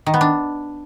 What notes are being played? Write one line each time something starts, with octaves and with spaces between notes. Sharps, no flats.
D#3
B3
D4